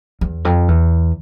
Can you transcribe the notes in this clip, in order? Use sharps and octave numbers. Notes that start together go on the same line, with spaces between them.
E2
F2
E2